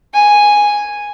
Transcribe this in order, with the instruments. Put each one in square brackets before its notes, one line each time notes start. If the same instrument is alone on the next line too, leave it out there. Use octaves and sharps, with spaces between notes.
[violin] G#5